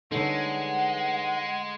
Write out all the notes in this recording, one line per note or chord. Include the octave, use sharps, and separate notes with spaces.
D3 G3 G#3 D#4 A4 B4 C#5 F#5